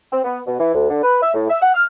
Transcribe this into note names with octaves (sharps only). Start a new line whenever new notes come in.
C4
B3
B2
E3
D2
D3
B4
E5
A2
E5
F#5
F6